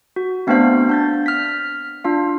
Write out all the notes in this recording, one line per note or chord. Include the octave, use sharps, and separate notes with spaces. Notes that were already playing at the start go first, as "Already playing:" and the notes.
F#4
A3 B3 C4 D4 C5 F5
D4 G6 A6
F6 B6
D4 F4 F5